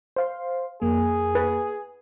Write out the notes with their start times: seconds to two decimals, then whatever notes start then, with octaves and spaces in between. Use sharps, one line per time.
0.16 C5 F5 C6
0.82 F2 A#3 G#4
1.35 B4